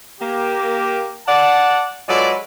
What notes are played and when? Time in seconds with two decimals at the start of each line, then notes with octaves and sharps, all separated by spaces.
0.20 A#3 G4
1.27 D5 F#5 A5
2.08 F#3 G#3 F4 A4 B4 D5